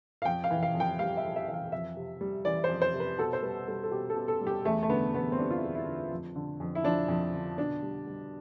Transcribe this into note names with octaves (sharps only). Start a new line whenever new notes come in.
F5
F2 G5
F5
E3
F5
F2
G5
G3 F5
E5
F2
E5
E3 E5
F5
F2 E5
C3
G3
E3 D5
C5
F2
C5
C3
B4
B2 A4
C5
G3 B4
G3 A4
A4
B2 G4
A4
B2
A4
G3
G4
E2 A3
A3
D3 B3
E2 B3
C4
G3 D4
F4
E4
E2
E4
D3
F2
D3
F2
E4
F3 D4
F2
D3
B2 D4
G3
G3